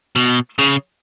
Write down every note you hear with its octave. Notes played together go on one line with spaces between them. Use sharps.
B2
C#3